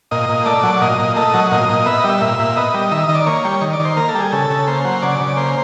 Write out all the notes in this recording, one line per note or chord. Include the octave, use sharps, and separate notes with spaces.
A#2 D#5
A#2
A3 D5
F#3
A#2 D#5
A#2
A3 D#5
F#3
A#2 D#5
A#2
B3 E5
D#5
G3
E5
A#2
A#2
B3 D#5
G3
D#3 E5
D#5
D#3
D5
A#3 C#5
G3
D#3
D5
D#3
C5
A#3 A#4
A4
G3
G#4
C#3 A4
C#3
A#3 C5
F#3
C#3 D5
C#3
A#3 C5